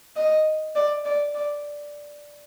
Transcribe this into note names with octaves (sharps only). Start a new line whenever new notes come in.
D#5
D5
D5
D5